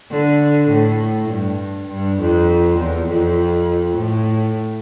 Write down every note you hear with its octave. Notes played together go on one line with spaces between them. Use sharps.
D3
A2
G2
G2
F2
E2
F2
A2